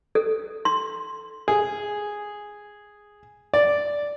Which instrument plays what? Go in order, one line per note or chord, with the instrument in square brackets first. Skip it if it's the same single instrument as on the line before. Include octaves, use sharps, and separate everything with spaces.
[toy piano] A4
C6
[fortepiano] G#4
D5